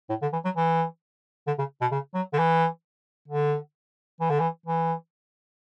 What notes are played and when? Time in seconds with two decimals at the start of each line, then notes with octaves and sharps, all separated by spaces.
0.09 A2
0.22 D3
0.32 E3
0.45 F#3
0.56 E3
1.47 D3
1.58 C#3
1.81 B2
1.91 C#3
2.14 F#3
2.33 D3
2.38 E3
3.28 D3
4.20 E3
4.30 D3
4.40 E3
4.66 E3